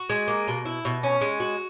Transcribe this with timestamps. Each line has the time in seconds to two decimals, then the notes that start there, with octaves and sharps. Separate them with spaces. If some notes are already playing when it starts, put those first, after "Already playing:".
Already playing: F#4
0.09 G#3
0.28 A#3
0.48 B2
0.65 E4
0.85 B2
1.03 C#4
1.21 G#3
1.40 F#4